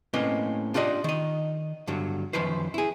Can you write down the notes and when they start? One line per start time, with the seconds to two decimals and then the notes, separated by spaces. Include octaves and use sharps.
0.14 A2 A#3 C4 C#4 B4 D#5
0.74 D4 F4 G4 D5 D#5
1.04 D#3 D#5
1.87 G2 D3 F#3
2.33 F#2 D#3 F3 B4 C5
2.74 E4 G#4